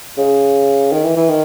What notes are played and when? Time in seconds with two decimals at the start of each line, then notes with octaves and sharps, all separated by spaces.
0.17 C#3
0.92 D#3
1.04 E3
1.16 E3
1.29 D#3